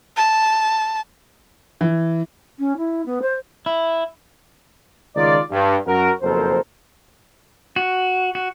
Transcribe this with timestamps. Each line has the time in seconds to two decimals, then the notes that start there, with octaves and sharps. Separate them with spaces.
0.17 A5
1.81 E3
2.59 C#4
2.77 E4
3.06 B3
3.22 C5
3.66 E4
5.16 C#2 D#3 D#4 F4 D5
5.51 G2
5.86 F#2 F#4 A#4
6.22 F#1 F2 B2 A4 A#4 C5
7.76 F#4
8.35 F#4